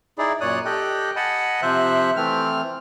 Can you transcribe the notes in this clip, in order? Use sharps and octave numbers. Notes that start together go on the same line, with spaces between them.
D#4 E4 G#4 D5
F#2 A#2 C#5 D5 D#6 F#6
G4 A4 D#5 G5 F#6
D#5 F#5 G#5 A5 B5
C3 F3 C5 E5 F#6
E3 A3 C4 F6